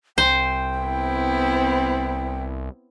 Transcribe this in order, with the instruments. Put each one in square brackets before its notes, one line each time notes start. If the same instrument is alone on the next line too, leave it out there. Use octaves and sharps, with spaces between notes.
[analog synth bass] C2 [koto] C5 [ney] G5
[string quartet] B3 C4 E4